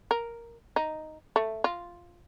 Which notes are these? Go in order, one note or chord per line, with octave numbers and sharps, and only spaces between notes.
A#4
D#4
A3
F4